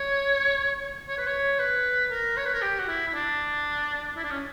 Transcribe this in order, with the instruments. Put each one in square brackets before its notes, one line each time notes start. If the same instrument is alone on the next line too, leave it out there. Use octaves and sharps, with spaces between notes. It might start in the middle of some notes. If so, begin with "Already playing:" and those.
Already playing: [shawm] C#5
C#5
B4
C#5
B4
A#4
C#5
B4
A#4
G4
F#4
E4
E4
D4
E4
D4
C#4